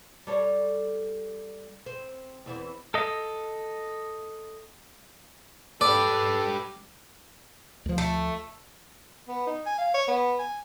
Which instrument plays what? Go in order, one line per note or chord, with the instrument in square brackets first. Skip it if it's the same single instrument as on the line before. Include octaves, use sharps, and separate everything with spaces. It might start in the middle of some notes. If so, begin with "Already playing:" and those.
[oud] G3 A4 C#5
C4
E2 E3 C4
[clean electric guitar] A4 D#5
[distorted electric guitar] G4 B4 [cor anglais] A4 [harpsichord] D5
[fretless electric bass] D2 F3
[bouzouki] A3
[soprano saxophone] B3
D#4
G#5
F5
C#5
B3
G#5